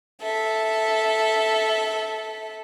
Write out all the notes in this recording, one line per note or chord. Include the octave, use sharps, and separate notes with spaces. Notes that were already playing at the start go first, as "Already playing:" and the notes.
A4 E5